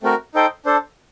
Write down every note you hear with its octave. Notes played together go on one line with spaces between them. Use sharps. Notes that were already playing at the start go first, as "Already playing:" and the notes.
A3 C4 F#4 A#4
D#4 A4 C5 G5
D4 A4 C5